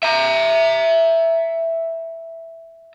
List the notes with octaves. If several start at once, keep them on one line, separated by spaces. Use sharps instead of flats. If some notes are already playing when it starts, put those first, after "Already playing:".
E5 A#5